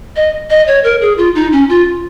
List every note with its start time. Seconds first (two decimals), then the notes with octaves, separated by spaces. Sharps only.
0.16 D#5
0.50 D#5
0.67 C#5
0.84 A#4
1.01 G#4
1.18 F4
1.35 D#4
1.52 C#4
1.69 F4